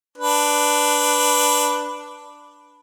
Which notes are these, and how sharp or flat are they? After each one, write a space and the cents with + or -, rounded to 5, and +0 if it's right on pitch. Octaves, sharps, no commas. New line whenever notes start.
D4 +0 B4 +0